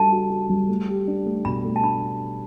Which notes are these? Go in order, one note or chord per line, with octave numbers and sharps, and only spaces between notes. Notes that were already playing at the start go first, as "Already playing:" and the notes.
Already playing: G3 D4 F#4 A4 A5
F#4
F#4
G3
A3
G4
D4
A3
B2 B5
A3
A5
D4 B5